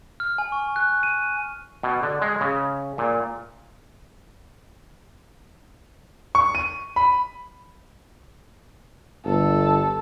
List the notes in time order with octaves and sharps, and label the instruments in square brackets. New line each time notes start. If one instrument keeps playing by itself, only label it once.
[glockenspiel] F6
G#5
C#6
F#6
D#7
[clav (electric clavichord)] B2
D3
G#3
C#3
A#2
[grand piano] C#6
D#7
B5
[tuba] G1 [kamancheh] A4